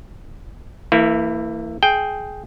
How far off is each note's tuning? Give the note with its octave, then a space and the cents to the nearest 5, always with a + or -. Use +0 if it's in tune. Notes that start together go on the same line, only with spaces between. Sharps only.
E3 +0 A#3 -40 E4 +0
G#4 +15 G5 +0